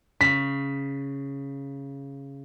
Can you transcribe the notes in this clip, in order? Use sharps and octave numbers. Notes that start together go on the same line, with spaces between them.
C#3 B6